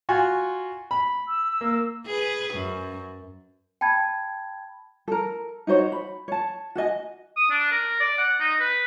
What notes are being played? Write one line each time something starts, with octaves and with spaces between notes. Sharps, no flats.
F4 F#4 G#5
B5
E6
A#3
G#4 B4
F#2
G5 A5 B5 G#6
A4 A#4
D#4 F#4 C5 C#5
B5
C#5 A5
F#4 A4 D#5 G#5
D#6
D4
A#4
D5
F#5
D#4
B4